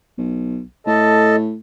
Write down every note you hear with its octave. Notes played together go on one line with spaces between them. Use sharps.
B1
A2 A4 D#5 A5